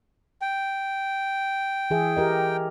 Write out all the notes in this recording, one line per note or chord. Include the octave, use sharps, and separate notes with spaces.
G5
E3 G#4 E5
G4 A#4 D#5